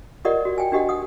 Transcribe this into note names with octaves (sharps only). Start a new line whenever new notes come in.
F4 G4 A#4 D5 D#5 F#5
F#4
G5 G#5
D4 F#4 G4 D#5 F#5
F#5 D#6